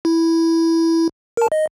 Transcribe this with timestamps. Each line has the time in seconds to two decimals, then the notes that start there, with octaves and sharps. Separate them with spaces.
0.05 E4
1.37 A#4 A5
1.52 D#5